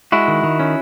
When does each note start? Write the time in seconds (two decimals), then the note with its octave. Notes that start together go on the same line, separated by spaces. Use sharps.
0.12 G#3 E4 F#4
0.28 D#3
0.43 D#3
0.60 C#4